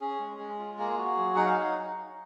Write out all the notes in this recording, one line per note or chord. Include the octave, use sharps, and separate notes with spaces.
C#4 G#4
G#3
G#3
F4
A#3 G#4
F#4
F#3
D#4 F#5
F5